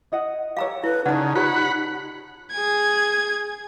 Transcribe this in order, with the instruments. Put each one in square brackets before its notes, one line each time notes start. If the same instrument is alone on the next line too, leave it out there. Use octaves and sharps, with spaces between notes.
[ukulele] E4 D#5 F#5
[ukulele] G4 B4 C#5 [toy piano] F5 A#5 E6
[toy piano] E4 [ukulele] A4 [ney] B4
[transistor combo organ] C#3 [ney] D#4 [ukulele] D5 A5 [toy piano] F#5
[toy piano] F4 G4 C#5 [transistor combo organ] F#5 B5
[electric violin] G#4 G#6